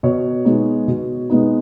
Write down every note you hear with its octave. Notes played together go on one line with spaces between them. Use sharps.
B2 C#5
G#3 B3 D#4
B2
G#3 B3 D#4